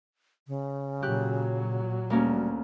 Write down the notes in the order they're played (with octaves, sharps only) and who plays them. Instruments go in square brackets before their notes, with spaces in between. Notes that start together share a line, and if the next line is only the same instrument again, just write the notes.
[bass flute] C#3
[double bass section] A#2 F#3 [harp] G4 F#6
[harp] D2 A#3 C#4 [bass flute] G3